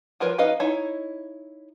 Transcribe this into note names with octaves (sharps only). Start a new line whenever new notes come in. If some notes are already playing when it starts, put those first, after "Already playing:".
F3 F4 A#4 B4 C#5
C#4 D#4 B4 D#5 F5
D#4 E4 C#5